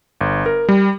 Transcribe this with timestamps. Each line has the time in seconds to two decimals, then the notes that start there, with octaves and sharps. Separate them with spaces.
0.21 G1
0.46 A#4
0.69 G3